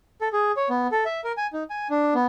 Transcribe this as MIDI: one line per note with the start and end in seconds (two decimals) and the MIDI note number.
0.21 0.28 69
0.33 0.52 68
0.57 0.69 73
0.69 0.87 59
0.92 1.04 69
1.05 1.21 76
1.24 1.32 70
1.37 1.47 80
1.53 1.63 63
1.70 1.88 80
1.90 2.14 62
2.14 2.27 59